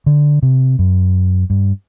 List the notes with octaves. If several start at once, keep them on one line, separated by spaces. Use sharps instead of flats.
D3
C3
F#2
G2